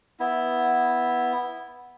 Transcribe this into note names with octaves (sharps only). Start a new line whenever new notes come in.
B3 E4